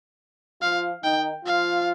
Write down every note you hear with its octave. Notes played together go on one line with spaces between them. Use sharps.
F3 F4 F5
D#3 D#4 G5
F3 F4 F5